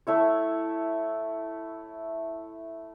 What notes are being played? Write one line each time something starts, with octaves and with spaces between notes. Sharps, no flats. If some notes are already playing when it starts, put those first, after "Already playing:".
A3 E4 C#5